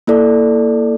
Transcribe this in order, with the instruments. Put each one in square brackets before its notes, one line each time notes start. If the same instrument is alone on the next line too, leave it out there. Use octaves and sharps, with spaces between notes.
[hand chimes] A#3 E4 A4 D5